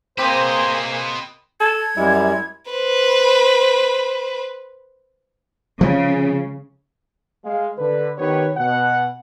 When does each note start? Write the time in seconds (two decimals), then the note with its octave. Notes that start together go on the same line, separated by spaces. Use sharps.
0.18 A#3 C4 G#4 B4 C5 D#5 D6
1.60 A4 G#6
1.97 F#2 G3 G#3 E4
2.71 B4 C5
5.81 C#3 F3 G#3
7.44 G#3 F5
7.78 D3 B4
8.18 D#3 B3 G4 B4 C#5
8.57 B2 F#5